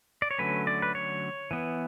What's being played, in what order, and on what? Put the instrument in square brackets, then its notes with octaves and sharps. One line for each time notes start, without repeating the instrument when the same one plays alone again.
[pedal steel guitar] D5
C#5
D3 F#3 A3 C#4 B4
D5
B4
C#5
E3 B3